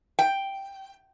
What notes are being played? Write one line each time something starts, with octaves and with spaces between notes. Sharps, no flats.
G5